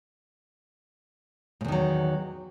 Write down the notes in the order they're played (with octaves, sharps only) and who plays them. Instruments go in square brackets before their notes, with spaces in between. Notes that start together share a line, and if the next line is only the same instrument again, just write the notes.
[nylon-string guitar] G#2
E2
D#3
F#3